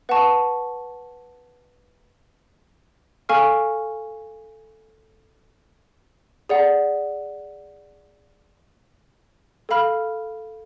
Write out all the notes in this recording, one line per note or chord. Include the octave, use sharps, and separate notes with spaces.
B4 F#5 A5 C#6
A4 F5 G#5 C#6 F6
G#4 D5 F#5
A4 F5 B5 F6